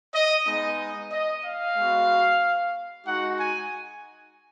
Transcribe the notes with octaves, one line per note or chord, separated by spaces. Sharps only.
D#5
G#3 B3 D#4 D#5
D#5
F5
G#3 B3 F#4
G#3 D#4 F#4 F#5
G#5